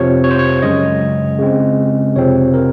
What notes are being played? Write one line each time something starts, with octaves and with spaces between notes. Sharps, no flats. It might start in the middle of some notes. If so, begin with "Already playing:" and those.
Already playing: F2 C3 F3 C#5
C#5
C5
C#5
F#2 C#3 G#3 D#5
C#3 G#3 C4
F2 C3 F3 C4 C#5
A#4